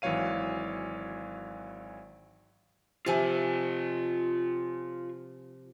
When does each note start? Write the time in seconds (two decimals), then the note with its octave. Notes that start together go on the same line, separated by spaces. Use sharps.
0.02 G#1 E3 F#3 C#5 F5 D#7
3.06 C3 F3 F4 G#5